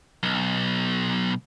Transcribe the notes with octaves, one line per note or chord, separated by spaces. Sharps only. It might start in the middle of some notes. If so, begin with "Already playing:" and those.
B1